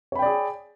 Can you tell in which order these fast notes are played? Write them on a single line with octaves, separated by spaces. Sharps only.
C#5 B5 G5 D5 G#4